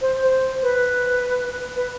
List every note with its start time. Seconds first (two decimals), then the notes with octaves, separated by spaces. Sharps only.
0.01 C5
0.23 C5
0.63 B4
1.76 B4